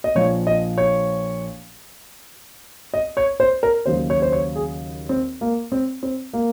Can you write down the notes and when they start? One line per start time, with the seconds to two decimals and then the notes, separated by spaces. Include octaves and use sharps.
0.04 D#5
0.15 A#1 A#2 F3 C#5
0.47 D#5
0.78 C#5
2.94 D#5
3.17 C#5
3.40 C5
3.63 A#4
3.86 D#2 C#3 F#3 C5
4.10 C#5
4.22 C5
4.32 C#5
4.55 G#4
5.09 C4
5.41 A#3
5.72 C4
6.03 C4
6.33 A#3